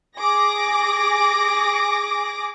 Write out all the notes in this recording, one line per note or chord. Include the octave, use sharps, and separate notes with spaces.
G#4 D6 A#6